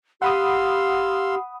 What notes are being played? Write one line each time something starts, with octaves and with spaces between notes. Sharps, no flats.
G4 F5 F#5 B5 C6 D#6 E6